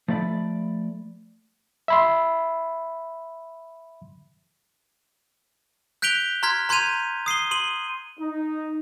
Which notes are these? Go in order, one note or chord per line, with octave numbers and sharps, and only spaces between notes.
F3 A3 D5 B5
E5 B5 C6
F#6 G6 B6 D7 F7 G7
A#5 C6 F6 G#6 B6
A#5 C6 G6 G#6 D#7 F7
D#6 C7 D#7 G7
C6 D#7 F#7
D#4